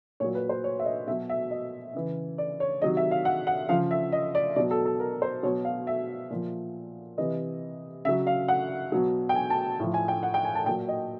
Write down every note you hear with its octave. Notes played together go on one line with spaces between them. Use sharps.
A#2 F#3 C#5
B4
C5
C#5
E5
D#5
B2 F#3 E5
E5
D#5
C#3 E3
D5
C#5
C3 D#3 F#3 D#5
E5
F5
F#5
F#5
C#3 F3 F5
E5
D#5
D5
B2 F#3 D5
A4
A4
A#4
C5
B2 F#3 C#5
F5
E5
A#2 F3
C3 E3 D#5
C#3 F#3 E5
F5
F#5
B2 F#3
G5
G#5
A5
A2 F3
G#5
G5
F#5
G5
G#5
A5
A#2 F#3 G5
D#5